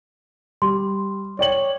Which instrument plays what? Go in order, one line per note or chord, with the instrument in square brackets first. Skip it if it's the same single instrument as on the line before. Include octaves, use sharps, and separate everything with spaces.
[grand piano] G3 [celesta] C6
[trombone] C#5 [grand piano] D5 G5 F#7